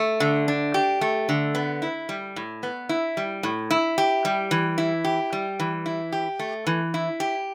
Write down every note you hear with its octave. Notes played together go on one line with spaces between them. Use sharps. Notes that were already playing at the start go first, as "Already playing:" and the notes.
Already playing: A3
D3
D4
G4
A3
D3
B3
E4
G3
A2
B3
E4
G3
A2
E4
G4
G3
E3
E4
G4
G3
E3
E4
G4
A3
E3
E4
G4